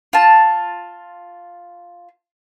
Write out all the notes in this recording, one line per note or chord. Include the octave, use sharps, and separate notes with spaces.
F4 A5